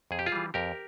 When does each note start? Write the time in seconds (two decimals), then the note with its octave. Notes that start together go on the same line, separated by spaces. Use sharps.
0.11 F2 G#4
0.19 G4
0.26 F4 G#4
0.32 E3 G3
0.54 F2 G4 A#4